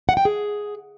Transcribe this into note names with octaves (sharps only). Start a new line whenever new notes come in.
F#5
G5
G#4